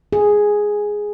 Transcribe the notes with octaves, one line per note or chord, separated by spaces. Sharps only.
G#4